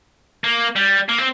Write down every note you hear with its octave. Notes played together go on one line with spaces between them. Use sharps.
A#3
G3
A#3
C4